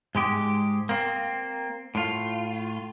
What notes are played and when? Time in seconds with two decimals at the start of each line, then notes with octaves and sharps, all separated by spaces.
0.15 G#2 G#3 G4
0.89 A#3 C4
1.95 A2 F4